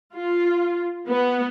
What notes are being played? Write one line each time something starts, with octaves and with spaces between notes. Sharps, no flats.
F4
B3